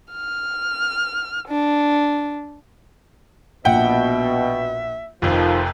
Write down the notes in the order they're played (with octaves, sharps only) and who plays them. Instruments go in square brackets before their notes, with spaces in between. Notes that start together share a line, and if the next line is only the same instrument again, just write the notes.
[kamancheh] F6
D4
[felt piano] A#1 F#5 [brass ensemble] B2 [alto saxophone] E5 [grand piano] G5
[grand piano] F1 F2 [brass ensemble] D#3 F3 [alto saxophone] F4